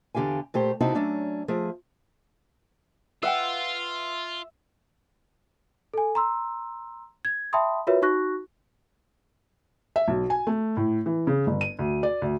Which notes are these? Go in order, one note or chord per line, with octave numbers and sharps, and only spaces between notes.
E2 D3 G4 F5 G#5
A#2 A3 G4 C5
C3 C4 D#4 E4 F#4 A5
F#3 A3 C#4 D4
F3 A3 G#4
F4 B4 E5 F#5 G5
A4 G#5
A#5 C6 E6
G#6
E5 G5 A5 B5 C6 D#6
F4 F#4 A#4 B4 C#5 E5
D#4 F#4 C#6 F#6 A#6
E5
B1
G#5
A3
A2
E3
C#3
G1
D#7
D2
D5
D2